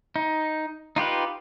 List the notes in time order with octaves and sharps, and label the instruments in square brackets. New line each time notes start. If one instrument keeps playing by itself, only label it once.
[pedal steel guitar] D#4
D#4 F4 G4 B4